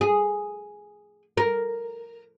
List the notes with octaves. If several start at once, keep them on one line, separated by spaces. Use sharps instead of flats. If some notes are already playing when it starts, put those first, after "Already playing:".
G#4
A#4